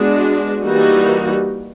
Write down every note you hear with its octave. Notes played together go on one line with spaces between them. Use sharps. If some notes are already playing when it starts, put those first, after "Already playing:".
Already playing: G#3 B3 D4 F#4
E3 G3 A#3 D#4 F#4